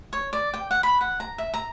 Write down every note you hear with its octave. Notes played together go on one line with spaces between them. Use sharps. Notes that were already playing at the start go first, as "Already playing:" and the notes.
C#5
D5
G5
F#5
B5
F#5
A#5
E5
A#5